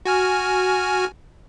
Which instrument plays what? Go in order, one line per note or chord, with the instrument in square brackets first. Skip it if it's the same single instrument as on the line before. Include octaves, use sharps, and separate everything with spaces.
[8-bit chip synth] F#4 G#5 F6